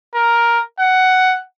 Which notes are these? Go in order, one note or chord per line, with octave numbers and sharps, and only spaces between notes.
A#4
F#5